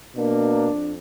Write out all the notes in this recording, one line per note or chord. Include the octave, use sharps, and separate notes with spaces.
B2 A#3 D4
F2